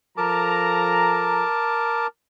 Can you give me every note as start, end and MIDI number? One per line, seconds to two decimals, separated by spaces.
0.18 1.44 53
0.18 1.44 69
0.18 2.07 70
0.18 2.07 81
0.18 1.44 82
0.18 2.07 86